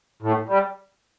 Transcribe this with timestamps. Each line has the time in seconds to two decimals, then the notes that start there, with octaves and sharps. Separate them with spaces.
0.22 A2
0.48 G3